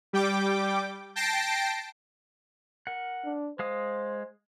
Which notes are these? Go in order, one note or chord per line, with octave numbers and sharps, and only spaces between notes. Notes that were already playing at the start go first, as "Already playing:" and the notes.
G3 G5 D6
G5 A5 A#6 C7 D7
A#4 F#5
D4
G#3 C5 F5 D#6